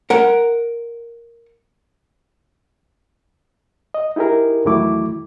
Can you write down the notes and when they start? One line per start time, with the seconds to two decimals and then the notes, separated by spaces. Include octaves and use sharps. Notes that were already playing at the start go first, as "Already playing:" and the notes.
0.10 A#4 F#5
3.94 D#5
4.16 D#4 E4 G4 G#4 A#4
4.65 E2 D#3 F#3 A3 E4 D6